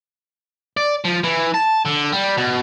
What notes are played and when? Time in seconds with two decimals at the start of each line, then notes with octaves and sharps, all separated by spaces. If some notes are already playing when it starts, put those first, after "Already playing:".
0.77 D5
1.04 F3
1.24 E3
1.54 A5
1.85 D3
2.12 G3
2.37 B2